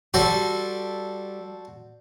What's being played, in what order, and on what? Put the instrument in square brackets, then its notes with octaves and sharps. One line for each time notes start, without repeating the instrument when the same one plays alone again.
[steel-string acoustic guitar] G3 [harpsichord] F#4 A4 C5